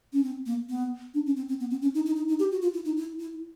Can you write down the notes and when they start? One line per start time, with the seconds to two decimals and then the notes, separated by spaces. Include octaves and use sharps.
0.13 C#4
0.23 C4
0.46 A#3
0.69 B3
1.14 D4
1.26 C#4
1.36 C4
1.49 C4
1.60 B3
1.70 C4
1.82 C#4
1.94 D#4
2.06 D#4
2.16 D#4
2.28 D#4
2.39 G4
2.51 F#4
2.62 F4
2.74 E4
2.85 D#4
2.97 E4
3.20 E4